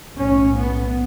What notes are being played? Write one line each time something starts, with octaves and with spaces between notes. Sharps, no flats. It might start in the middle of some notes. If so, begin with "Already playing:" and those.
B1 A2 C#4
B3